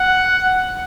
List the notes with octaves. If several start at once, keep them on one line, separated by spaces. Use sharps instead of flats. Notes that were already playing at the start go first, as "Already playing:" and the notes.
Already playing: F#5